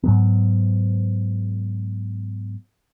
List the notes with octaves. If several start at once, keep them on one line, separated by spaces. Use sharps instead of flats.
G#2 F#3 B3